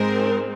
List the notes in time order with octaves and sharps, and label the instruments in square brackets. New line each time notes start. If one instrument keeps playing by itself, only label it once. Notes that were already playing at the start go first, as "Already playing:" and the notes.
Already playing: [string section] G#2 G#3 C4 A#4